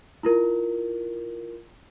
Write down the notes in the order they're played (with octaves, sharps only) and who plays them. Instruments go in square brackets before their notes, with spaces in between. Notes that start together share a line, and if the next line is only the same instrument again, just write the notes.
[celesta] E4 F4 A#4